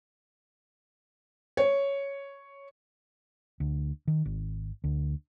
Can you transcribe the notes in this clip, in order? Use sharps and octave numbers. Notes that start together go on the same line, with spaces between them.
C#5
D2
D#3
G#1
D2